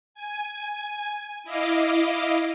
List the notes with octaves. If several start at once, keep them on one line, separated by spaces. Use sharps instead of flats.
G#5
E4 D#5 F5 D6